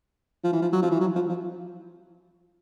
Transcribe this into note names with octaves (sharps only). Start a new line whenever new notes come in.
F3
E3
F3
F#3
F3
E3
F#3
F3
F3